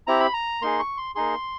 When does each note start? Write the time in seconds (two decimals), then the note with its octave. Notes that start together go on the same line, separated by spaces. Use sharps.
0.07 C4 E4 G4 A#5
0.20 B5
0.34 A#5
0.62 A#3 D#4 G#4 C6
0.79 C#6
0.97 C6
1.15 A#3 D#4 G#4 C6